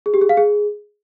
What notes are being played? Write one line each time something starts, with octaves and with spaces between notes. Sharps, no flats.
G#4
G4
G#4
F5
G#4